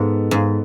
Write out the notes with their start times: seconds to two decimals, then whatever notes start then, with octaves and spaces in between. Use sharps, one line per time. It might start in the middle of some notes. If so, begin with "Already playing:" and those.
Already playing: G#2 B3 A4
0.31 G#2